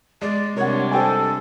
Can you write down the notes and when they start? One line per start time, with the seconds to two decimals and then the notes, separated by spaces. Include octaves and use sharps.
0.22 G#3 D5
0.56 C3 G3 D4 A#4 C#5 F#5
0.91 A4 C5 G5 G#5